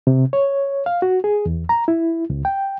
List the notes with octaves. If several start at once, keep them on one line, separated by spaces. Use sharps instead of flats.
C3
C#5
F5
F#4
G#4
E2
A#5
E4
C#2
G5